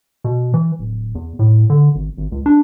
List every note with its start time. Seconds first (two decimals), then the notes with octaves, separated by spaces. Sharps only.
0.24 B2
0.54 E3
0.79 D1
1.15 E2
1.39 A2
1.70 D3
1.95 G#1
2.17 G#1
2.32 C#2
2.46 D4